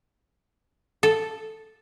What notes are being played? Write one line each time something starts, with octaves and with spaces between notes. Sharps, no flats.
A4